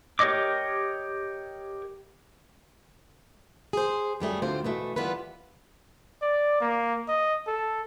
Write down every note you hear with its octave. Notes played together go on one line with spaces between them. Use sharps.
G4 A#4 C#5 D#5 D6
G#4 C5
F#2 G3 A3 G#4
D2 C4 F4 C5 D5
B2 E3 A3
E3 G3 B3 F4 B4
D5
A#3
D#5
A4